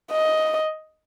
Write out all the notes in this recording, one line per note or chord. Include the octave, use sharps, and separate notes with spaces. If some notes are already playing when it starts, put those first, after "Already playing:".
D#5